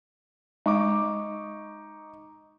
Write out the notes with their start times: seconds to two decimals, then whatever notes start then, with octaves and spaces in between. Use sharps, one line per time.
0.66 G#3 D#4 C#6 D6